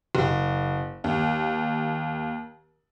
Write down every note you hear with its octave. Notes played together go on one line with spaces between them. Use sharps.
F#1
D#2